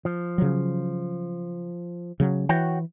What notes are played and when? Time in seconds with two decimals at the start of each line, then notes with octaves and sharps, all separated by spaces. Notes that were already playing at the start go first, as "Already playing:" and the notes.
0.05 F3
0.38 C#3 F#3
2.20 C#3 F#3
2.49 E3 F#4 C#5 G5